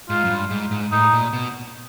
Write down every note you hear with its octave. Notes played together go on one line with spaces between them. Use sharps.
G#2 F4
F#2
G2
G#2
G#2
A2 D#4
A#2
B2